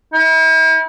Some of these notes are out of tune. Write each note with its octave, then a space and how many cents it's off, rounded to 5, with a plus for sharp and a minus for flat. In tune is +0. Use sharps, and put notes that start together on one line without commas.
E4 -40